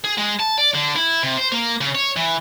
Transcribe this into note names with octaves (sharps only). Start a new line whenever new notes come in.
G#4
G#3
A5
D5
D3
E4
C3
C5
A#3
C#3
C#5
E3